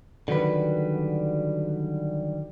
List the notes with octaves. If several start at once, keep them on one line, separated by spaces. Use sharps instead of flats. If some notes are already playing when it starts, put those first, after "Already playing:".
D3 D#3 F#3 G3 B4